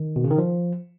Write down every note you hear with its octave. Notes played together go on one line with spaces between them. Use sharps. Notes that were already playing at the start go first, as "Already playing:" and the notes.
Already playing: D#3
B2
C#3
D#3
F3